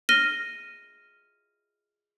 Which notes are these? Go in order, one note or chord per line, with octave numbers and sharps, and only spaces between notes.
F6 A#6 D#7 G7